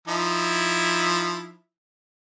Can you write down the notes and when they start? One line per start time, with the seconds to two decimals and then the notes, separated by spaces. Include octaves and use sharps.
0.08 F3 D#4 E4